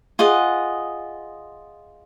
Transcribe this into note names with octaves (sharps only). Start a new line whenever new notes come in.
F4 G#4 D#5 F#5